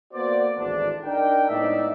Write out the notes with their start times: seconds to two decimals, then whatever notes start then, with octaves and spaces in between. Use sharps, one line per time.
0.13 A#3 B3 F#4 C5 D5
0.57 G#1 D2 A2 E3 D4
1.05 D4 D#4 A#4 G5
1.49 A2 G#3 B3 D#4 D5 E5